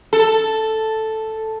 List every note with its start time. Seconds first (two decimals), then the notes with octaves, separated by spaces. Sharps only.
0.13 A4